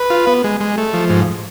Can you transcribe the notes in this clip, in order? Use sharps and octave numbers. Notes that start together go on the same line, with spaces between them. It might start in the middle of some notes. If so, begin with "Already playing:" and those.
Already playing: B4
F4
B3
G#3
G#3
A3
F3
G#2